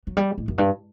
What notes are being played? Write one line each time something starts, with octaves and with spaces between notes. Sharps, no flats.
F#3
G3
A2
F#2
G2